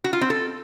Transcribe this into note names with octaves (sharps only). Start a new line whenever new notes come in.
F#4
F4
C4
A4